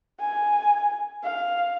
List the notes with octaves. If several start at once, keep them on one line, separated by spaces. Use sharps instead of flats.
G#5
F5